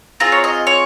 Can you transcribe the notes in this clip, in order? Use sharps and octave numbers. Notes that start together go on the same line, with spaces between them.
C4 F4 G#4 A#5
C#5
D#5
C#5